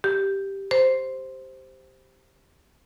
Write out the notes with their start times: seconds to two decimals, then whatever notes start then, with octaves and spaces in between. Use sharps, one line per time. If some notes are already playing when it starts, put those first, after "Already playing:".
0.04 G4
0.71 C5